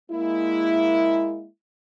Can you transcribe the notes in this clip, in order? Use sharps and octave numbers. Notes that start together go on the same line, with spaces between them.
G#3 A#3 E4